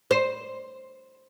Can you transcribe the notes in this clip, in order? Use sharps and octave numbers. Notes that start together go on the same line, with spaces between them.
C5